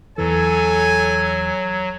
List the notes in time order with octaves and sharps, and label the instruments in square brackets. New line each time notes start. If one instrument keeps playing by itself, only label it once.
[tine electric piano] E2 E3 [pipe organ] F#3 [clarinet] A4 [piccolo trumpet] G#5